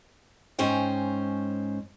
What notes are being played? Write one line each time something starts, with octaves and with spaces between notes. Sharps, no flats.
G#2 C#4 C5 G5